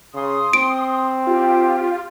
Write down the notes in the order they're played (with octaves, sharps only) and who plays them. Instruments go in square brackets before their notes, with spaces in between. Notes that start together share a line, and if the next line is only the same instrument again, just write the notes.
[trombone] C#3 [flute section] C6 D#6
[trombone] C4 [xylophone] D7
[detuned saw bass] F4 [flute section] G4